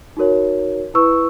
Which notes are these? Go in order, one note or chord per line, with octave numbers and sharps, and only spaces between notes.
D#4 F#4 A#4 C#5
E4 B4 C#6 E6